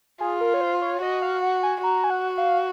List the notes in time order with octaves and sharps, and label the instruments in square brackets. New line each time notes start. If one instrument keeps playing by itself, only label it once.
[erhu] F4 [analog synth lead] G#4
[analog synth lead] A#4
C#5
C5
C#5
[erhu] F#4 [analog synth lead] D#5
[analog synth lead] F5
F#5
G#5
[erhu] F#4 [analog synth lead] A#5
[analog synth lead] G#5
F#5
F5